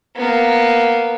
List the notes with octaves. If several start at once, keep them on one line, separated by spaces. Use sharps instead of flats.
A#3 B3